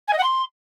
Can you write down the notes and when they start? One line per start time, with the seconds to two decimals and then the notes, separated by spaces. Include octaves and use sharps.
0.07 G#5
0.12 D#5
0.18 F#5
0.23 C6